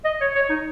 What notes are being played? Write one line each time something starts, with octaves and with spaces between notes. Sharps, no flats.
D#5
C#5
C#5
D#4